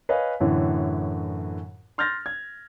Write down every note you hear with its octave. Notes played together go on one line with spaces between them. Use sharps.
B4 C#5 D#5 F5 G#5
F#2 A2 D3 E3
C6 F6 G6 A6 A#6
G#6